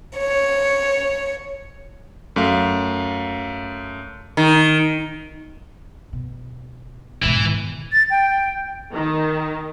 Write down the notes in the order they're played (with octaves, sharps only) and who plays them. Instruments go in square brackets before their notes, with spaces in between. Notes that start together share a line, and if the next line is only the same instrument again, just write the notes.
[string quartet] C#5
[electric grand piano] F#2 A3 F5
[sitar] D#3
[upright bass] B2
[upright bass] G#2 B2 [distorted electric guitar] E3
[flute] A6
G5
[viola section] D#3